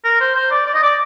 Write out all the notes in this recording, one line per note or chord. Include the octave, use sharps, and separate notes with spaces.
A#4
C5
C5
D5
D5
D#5
D5